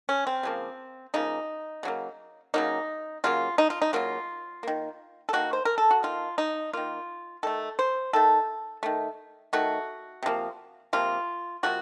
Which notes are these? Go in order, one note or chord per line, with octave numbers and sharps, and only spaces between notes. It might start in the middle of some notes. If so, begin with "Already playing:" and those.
C#4
C4
C#3 F3 A#3
C#3 F3 A#3 D#4
C#3 F#3 A#3
C#3 F#3 A#3 D#4
C#3 F#3 A#3 F4
D#4
F4
D#4
C#3 F#3 A#3 F4
D#3 A#3
A4
D#3 A#3 F#4
C5
A#4
A4
F#4
D#3 A#3 F4
D#4
D#3 A#3 F4
D#3 A3 A4
C5
D#3 A3 A4
D#3 A3
D#3 A3 F#4
C3 F3 A#3
C3 F3 A#3 F4
C3 F3 A#3 F#4